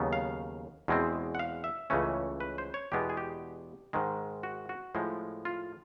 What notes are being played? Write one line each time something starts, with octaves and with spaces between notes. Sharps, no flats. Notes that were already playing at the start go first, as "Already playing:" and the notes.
Already playing: D#2 C#3 F#3 B3
F5
E2 B2 G#3 C4
F#5
F5
E5
C#2 C#3 E3 A3 C#4
B4
C5
C#5
E2 B2 G#3 B3 G4
G#4
G4
G#2 D#3 G#3
F#4
F#4
A2 F3 G#3
F4